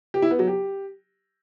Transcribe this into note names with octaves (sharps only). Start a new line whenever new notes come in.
G4
E4
B3
F#3
G4